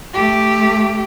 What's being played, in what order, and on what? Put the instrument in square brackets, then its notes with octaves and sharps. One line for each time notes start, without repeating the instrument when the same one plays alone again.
[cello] A3 G4